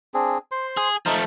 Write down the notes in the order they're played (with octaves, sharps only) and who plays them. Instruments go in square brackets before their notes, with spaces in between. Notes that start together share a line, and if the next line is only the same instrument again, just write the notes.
[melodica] C4 D4 G#4
C5 C6
[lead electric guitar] G#4
[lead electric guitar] F3 A3 [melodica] D#4